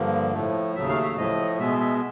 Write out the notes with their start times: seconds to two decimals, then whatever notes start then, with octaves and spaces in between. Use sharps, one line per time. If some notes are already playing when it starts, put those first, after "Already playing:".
Already playing: G2 D3 F3 A#3
0.33 A2 F3 A3
0.75 D#2 C#3 F#3 A3 E5
0.89 F5
1.03 E5
1.17 A2 F3 A3 D#5
1.59 B2 G#3 B3 E5
1.80 E5